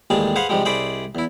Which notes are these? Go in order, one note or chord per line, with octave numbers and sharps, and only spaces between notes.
A1 D#2 G3 G#3 G#4 A5
G#4 B4 C5 F5 F#5 G#5
G#2 C3 F3 G3 G#3
C2 G#4 C5 D5 D#5 B5
E2 E4